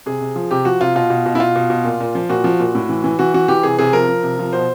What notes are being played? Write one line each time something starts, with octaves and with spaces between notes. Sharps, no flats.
C3 G#4
C3
F3
C3 G4
F3 F#4
C3 F4
B2 F4
B2
B2
E4
B2 F4
B2
B2
A#2
A#2
F3
A#2 F#4
F3
A#2
A2
E3
E3
E3 F#4
E3 F#4
E3 G4
C3 G#4
C3 G#4
F3 A#4
F3
C3
F3
B2 C5